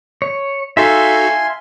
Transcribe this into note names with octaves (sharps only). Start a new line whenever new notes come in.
C#5
D#4 F#4 A4 E5 F5 G#5 A5 C6